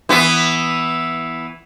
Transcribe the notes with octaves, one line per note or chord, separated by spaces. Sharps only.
E3 B3